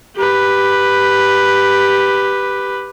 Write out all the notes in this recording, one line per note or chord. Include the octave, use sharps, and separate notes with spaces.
G4 B4